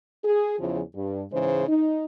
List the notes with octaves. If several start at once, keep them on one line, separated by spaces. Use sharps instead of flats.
G#4
E2 C#3 E3 F3
G2
G#2 C#3 E3 G#3 C5
D#4